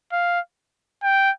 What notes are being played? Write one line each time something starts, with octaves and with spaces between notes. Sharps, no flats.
F5
G5